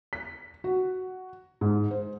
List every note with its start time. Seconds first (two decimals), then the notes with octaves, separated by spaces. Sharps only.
0.13 B6
0.64 F#4
1.61 G#2
1.91 C5